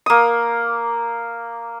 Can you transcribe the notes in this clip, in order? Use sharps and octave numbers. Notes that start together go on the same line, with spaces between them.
A#3 D#6